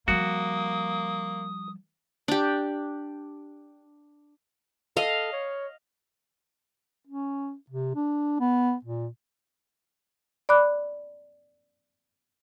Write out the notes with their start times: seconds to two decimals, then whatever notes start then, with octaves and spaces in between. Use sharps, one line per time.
0.08 F3 G3 A#3 F#4 D#6
2.28 D4 G4
4.97 A4 D#5 F5
5.32 C#5
7.07 C#4
7.70 C3
7.95 D4
8.40 B3
8.84 A#2
10.49 D5 B5 D6 F#6